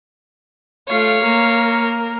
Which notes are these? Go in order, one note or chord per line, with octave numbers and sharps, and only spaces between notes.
A3 F4 C#5 F5
A#3 A#4